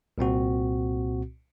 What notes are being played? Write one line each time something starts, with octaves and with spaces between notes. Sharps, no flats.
C2 A#2 C4 F#4